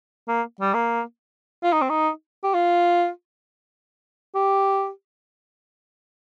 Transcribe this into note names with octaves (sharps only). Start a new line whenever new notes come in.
A#3
G3
A#3
F4
D#4
C4
D#4
G4
F4
G4